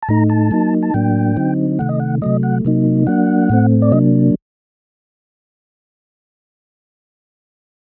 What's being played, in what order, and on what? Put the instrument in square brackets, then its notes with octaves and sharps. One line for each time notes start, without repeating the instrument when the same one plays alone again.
[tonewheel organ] A5
A2 A3 D#4 A#5
A5
F#3 A#3 D#4
A5
A2 F#3 A#3 D4 G5
D3 F#3 C4 D#4
C3 D#3 A3 F#5
D#5
F#5
C3 F#3 A3 D#5
F#5
C3 F#3 A#3 D#4
F#3 A#3 D4 F#5
A2 A3 C4
D5
C3 F#3 A#3 D4 D#5